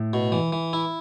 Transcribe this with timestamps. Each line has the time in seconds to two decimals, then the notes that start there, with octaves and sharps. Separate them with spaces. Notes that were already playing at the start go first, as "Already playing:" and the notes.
Already playing: A2
0.13 B2
0.32 E3
0.52 E3
0.73 E4